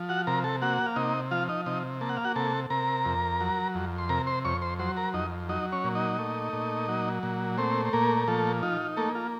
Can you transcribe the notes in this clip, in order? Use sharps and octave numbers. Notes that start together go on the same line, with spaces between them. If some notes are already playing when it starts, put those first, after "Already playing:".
Already playing: F3
F#4 F#5
C3 A#4 A#5
A4 A5
A#3 F#4 F#5
F5
C3 D#4 D#5
F3 F4 F5
D#4 D#5
C3 D#4 D#5
A#3 A5
F#5
F5
F#4 F#5
C3 A4 A5
C3 A#4 A#5
F2
F#3
F2
C6
C3 A#4 A#5
C5 C6
F2 C#5 C#6
C5 C6
F#3 C5 C6
A#4 A#5
F2 D#4 D#5
F#3 D#4 D#5
C#4 C#5
A#2
D#4 D#5
A3
A#2
F#3
A#2
A3 C4 C5
C5
A#2 A#3 A#4
A#4
F3 A3 A4
D#4 F4
A3 A#3 A4
F4